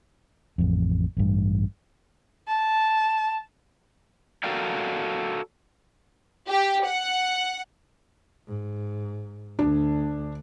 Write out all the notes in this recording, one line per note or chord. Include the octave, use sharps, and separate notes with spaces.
A1 F2
A1 G2
A5
F#4 A4 A#4 D5 F5 G5
G4
F#5
G#2
D2 D4